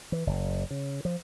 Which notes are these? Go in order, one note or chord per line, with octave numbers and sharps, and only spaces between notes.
E3
F#1
C#3
F3